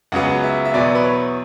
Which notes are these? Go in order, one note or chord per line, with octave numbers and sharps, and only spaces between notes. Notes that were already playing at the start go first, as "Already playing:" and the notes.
C#2 C#3 F#3 B3 F#5
E5
E5
E2 B2 F#3 B3 E4 D5
B4
C#5